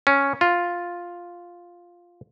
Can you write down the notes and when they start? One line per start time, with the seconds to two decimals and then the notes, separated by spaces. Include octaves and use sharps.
0.07 C#4
0.41 F4